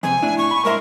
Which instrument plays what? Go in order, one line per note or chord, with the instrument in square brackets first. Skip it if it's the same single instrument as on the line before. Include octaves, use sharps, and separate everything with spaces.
[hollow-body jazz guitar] F2 C3 [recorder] G#5
[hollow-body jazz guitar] A2 D4 E4
[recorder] C#6
[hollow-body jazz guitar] B5
[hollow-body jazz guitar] G#2 E5 C6 [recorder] A#4